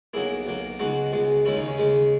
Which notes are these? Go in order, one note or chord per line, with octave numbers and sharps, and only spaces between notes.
B1 B2 F#3 A#3 E4 G#4
B1 B2 F#3 A#3
C#2 B2 G#3 D#4 F#4
C#2 B2 G#3
D#2 C#3 G#3 C#4 E4
D#4
C#4
D#2 C#3 G#3